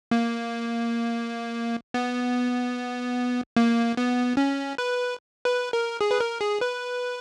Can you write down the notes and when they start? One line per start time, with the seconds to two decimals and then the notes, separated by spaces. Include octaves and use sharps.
0.11 A#3
1.94 B3
3.56 A#3
3.97 B3
4.37 C#4
4.78 B4
5.45 B4
5.73 A#4
6.01 G#4
6.11 B4
6.20 A#4
6.41 G#4
6.61 B4